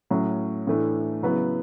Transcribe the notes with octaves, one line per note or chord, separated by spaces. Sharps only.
A2 F#3 C#4
A2 E3 A3 D4
C#3 F#3 B3 E4